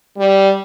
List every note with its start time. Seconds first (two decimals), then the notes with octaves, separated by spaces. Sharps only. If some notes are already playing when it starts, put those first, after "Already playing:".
0.18 G3